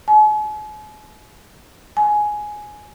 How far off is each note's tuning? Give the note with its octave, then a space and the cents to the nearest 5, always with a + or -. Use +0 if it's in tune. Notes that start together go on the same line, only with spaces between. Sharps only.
G#5 +45
G#5 +10